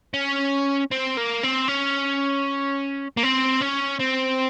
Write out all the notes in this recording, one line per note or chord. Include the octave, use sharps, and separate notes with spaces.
C#4
C4
A#3
C4
C#4
A#3
C4
C#4
C4